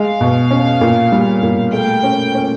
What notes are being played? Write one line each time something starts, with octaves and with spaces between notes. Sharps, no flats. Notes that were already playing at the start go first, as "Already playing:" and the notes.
Already playing: G#3 F5
B2
C#4
A#2
G3
A#2
A3 G5
C#4
C#4